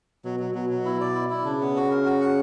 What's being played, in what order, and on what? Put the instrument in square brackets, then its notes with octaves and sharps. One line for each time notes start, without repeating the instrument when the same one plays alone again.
[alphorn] B2 [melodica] F#3
[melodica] F#3
[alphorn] B2 [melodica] F#3
[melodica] F#3
[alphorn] B2 [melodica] E4
[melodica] D5
E4
E4
[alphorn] C#3 [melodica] D4
[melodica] B3
F#4
A#4
F#4
F#5